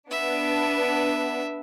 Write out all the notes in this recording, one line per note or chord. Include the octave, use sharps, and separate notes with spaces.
B3 D4 E5